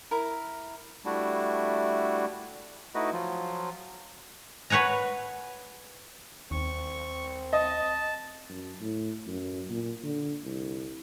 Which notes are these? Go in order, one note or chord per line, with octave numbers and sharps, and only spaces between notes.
E4 A#4
G3 A3 D4 E4 F#4
A3 D#4 E4 F#4 B4 D#5
F3 F#3 F4
B4 C#5 F#5 G#5 A#5
D#2 C4 C#6
D#5 A5
F#2
A2
F#2
A#2
D3
C2